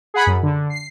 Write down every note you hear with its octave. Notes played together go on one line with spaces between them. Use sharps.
G#4 F#5 B5
F#2
D3
C7